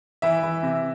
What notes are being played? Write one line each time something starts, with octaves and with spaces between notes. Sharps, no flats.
E3 E5
E3
C3